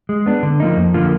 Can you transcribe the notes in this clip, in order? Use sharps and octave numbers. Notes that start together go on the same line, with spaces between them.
G#3
B3 D4
D3
F3 A#3 D#4
F2
D3 F3 A#3 F4